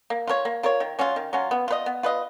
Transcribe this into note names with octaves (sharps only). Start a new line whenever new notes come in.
A#3
F4 A#4 C#5
A#3
F4 A#4 C#5
D#3
F#3 C#4 F4
D#3
F#3 C#4 F4
B3
F4 B4 D#5
B3
F4 B4 D#5